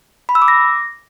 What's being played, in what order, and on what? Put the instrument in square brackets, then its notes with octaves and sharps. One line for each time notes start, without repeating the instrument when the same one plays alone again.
[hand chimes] B5
E6
D6
A#6